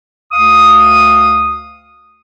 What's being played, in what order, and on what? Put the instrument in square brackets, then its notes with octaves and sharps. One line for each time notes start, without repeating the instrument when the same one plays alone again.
[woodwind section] D2 F5 D#6